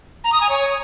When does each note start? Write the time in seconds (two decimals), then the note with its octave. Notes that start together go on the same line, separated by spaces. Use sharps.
0.24 A#5
0.32 D#6
0.41 G#5
0.49 C#5